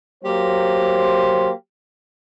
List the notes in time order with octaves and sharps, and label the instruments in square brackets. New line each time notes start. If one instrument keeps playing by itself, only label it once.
[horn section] F#3 A#3 G4 C5